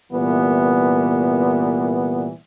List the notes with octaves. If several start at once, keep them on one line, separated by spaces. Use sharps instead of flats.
C2 A#2 E3 B3